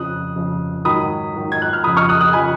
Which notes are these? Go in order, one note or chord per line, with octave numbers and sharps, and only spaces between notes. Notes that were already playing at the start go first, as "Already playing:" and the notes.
Already playing: F2 C#3 F3 D#6 F#6
F2 C#3 F3
G#2 D#3 F#3 B5 D#6
G#2 D#3 F#3
G#6
F#6
F6
F2 C#3 F3 B5 D#6
C#6 F6
D#6 F#6
D#6 F#6
C#3 F3 G#5 B5